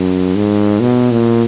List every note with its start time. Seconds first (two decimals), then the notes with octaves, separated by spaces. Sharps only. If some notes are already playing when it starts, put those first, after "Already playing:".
Already playing: F#2
0.35 G#2
0.81 B2
1.11 A#2